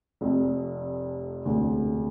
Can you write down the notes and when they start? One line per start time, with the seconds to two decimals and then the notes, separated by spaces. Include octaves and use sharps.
0.21 F1 F2 C3
1.45 E1 D2 C3